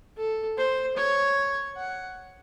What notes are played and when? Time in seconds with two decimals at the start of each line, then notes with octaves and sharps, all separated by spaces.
0.17 A4
0.57 C5
0.97 C#5
1.77 F#5